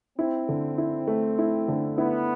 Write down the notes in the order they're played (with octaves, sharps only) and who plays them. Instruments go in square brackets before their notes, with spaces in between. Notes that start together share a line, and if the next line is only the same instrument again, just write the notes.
[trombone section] C4 [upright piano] E4
[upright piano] D3
E4
A3
E4
D3
[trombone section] B3 [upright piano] E4